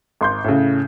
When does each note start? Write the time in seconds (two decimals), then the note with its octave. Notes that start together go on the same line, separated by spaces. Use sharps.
0.21 G#1 C6 G6
0.44 A2 C#3